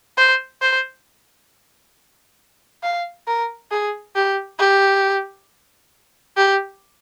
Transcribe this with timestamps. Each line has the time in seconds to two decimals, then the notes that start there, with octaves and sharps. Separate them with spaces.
0.17 C5
0.62 C5
2.83 F5
3.27 A#4
3.71 G#4
4.15 G4
4.59 G4
6.37 G4